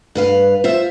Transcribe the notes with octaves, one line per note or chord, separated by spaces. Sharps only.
G2 B4 F5
F4 C5 E5